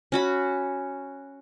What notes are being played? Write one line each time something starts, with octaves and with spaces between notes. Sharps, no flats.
C#4 F#4 B5